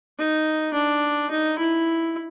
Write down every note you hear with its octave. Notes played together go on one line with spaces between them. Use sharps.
D#4
D4
D#4
E4